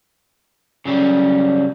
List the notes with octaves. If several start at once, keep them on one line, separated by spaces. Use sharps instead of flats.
C#3 F#3 G3 C#4